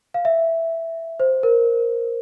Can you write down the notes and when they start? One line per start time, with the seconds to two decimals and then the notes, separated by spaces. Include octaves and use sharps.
0.14 F5
0.25 E5
1.20 C5
1.43 A#4